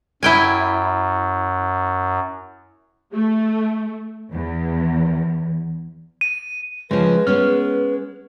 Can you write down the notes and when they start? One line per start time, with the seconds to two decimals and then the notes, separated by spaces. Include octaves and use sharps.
0.23 F#2 E4 G5 G#5
3.13 A3
4.32 E2
6.21 D#7
6.91 C#3 F3 G#3 B4
7.27 G#3 B3 C#4 F6